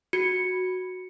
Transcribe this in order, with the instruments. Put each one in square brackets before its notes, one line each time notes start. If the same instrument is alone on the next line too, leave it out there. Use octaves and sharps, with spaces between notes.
[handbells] F#4 [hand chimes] C#7